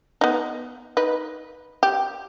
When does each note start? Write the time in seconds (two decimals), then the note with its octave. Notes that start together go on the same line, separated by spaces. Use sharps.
0.21 B3 D#4
0.97 D#4 B4
1.83 G4